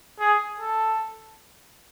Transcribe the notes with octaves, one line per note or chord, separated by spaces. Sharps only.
G#4
A4